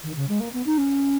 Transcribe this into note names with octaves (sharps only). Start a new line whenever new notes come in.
D#3
C#3
G#3
A#3
B3
D#4
C#4